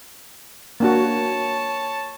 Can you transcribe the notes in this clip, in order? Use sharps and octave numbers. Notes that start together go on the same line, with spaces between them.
A#3 D4 F#4 C#5 A5